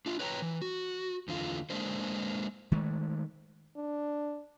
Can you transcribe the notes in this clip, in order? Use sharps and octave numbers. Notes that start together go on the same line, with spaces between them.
D4 F4
B4 C#5 G5 G#5 A#5
E3
F#4
E2 D3 F4
G#3 A#3 D4 C5
D#3 G#3 A3
D4